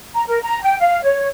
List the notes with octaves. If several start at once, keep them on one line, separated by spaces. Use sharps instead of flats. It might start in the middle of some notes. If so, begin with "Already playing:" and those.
A#5
A#4
A#5
G5
F5
C#5